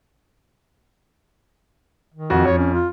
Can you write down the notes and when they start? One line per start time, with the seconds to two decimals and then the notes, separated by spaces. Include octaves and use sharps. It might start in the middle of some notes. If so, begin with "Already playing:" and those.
2.14 D#3
2.30 F2 F#4
2.45 F2 C#5
2.58 C#4
2.74 F4